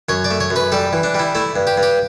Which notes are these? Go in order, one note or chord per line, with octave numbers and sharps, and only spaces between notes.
F#2 C#5
D5
A3
C#5
F#2
B4
G3 A4
E3
D4
G3 E4
A3 E4
G2
G4
G2
G4